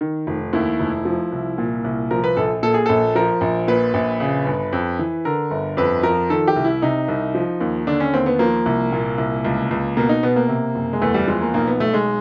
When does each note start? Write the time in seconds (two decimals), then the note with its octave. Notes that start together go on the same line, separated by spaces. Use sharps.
0.01 D#3
0.27 F1
0.53 D#2 E4
0.80 F1
1.05 F3
1.32 C2
1.58 A#2
1.84 C2
2.11 F3 A#4
2.24 B4
2.37 A#1 A4
2.63 A#2 A4
2.74 G#4
2.86 A#1 A4
3.15 F3 A#4
3.41 A#1
3.68 A#2 B4
3.94 A#1
4.20 C#3
4.46 G1
4.73 F2
4.99 E3
5.25 D3 A#4
5.51 G1
5.77 F2 B4
6.03 F3 A#4
6.30 D#3 A4
6.48 G4
6.56 C2
6.64 E4
6.82 C3 D#4
7.08 C2
7.35 F3
7.61 D#2
7.87 D3 D4
8.00 C#4
8.13 D#2 C4
8.26 B3
8.39 F3 A#3
8.66 C2
8.92 A#2
9.18 C2
9.44 C#2
9.71 C#2
9.97 B2 A#3
10.09 D#4
10.23 B2 B3
10.36 A#3
10.49 C3
10.75 F#1
10.93 G#3
11.02 E2 A3
11.14 G3
11.28 F3 G#3
11.41 A#3
11.54 B1 A#3
11.67 B3
11.80 B1 A3
11.94 G#3